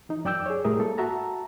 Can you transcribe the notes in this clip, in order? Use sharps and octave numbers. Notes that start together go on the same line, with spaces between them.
E3 D#4
F#2 D5 G5 D6 E6 G6
G#4 C#5
A2 G3 G#4 A#4 E5 D#6
A#3 A4
F#4 E5 A5 A#5